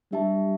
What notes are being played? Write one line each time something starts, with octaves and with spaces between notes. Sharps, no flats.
G3 D4 G4 E5 A5